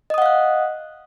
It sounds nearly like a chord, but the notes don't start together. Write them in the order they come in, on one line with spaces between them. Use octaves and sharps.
D#5 D#6 F#5 F5 F#6